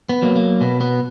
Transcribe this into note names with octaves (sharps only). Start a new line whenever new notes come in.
B3
F#3 A#3
A#3
B2 B3
B3